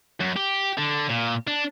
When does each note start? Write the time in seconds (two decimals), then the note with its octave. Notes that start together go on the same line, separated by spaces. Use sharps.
0.20 F#2
0.36 G4
0.78 D3
1.10 A#2
1.47 D4